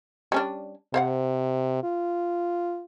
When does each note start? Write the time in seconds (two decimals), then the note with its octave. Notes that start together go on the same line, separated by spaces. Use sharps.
0.32 G3 C#4 D4
0.94 C3 C5 F5 F#5
1.84 F4